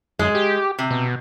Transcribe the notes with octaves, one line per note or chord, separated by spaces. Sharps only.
F#2 G#3
G4
C3
B2